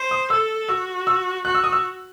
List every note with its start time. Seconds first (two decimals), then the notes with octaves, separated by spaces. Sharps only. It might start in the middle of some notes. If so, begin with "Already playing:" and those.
Already playing: C5
0.11 D#6
0.30 A4 E6
0.69 F#4 E6
1.07 E6
1.45 F#4 F#6
1.55 E6
1.64 D#6
1.72 E6